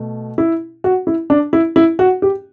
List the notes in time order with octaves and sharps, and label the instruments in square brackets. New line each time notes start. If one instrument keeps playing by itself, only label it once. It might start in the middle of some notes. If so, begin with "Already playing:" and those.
Already playing: [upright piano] B2 A3
E4
F#4
E4
D4
E4
E4
F#4
G4